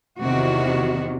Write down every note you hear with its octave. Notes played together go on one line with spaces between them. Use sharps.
E2 C3 D#3 F#4